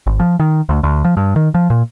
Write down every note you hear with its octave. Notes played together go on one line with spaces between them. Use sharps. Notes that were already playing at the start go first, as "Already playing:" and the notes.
G#1
F3
D#3
D2
D2
F3
G2
D#3
F3
A#2